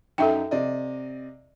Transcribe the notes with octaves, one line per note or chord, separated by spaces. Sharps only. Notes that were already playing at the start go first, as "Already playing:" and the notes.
F#2 D#4 A4 E5 G5
C3 D5 D#5